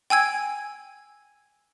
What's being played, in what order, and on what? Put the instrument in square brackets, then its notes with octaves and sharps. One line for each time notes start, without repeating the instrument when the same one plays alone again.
[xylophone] G5 G#5 E6 G#6